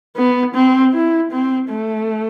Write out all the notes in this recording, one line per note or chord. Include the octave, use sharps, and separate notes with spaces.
B3
C4
E4
C4
A3